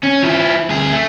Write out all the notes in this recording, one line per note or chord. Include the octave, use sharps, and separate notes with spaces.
C#4
F3 E4
D2 G#4
A3